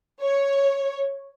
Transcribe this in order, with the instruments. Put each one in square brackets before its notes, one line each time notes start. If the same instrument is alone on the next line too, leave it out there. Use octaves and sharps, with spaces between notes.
[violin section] C#5